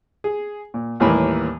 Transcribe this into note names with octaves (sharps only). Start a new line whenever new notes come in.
G#4
A#2
D#2 A2 E3 G3 A#3 B5